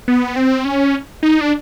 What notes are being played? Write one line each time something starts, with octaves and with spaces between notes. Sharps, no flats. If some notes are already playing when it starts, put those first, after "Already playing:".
B3
C4
C#4
D#4
D4